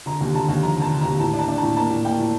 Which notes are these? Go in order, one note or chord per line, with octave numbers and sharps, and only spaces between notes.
D3 A#5
D#2
D3 A5
D#2
F3 A#5
D3 A5
D3
D#2 A#5
A2 A5
D4
A5
D4
A2 A5
A#3 A5
A2
A#3 G5
A2